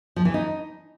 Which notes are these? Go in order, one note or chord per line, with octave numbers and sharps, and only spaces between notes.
F3
E3
D#4